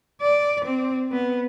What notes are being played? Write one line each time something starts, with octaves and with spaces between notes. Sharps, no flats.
D5
C4
B3